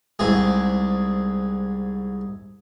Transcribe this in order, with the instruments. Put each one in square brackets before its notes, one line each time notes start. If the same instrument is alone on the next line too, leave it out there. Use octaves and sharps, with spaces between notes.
[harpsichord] C2 G#2 G#4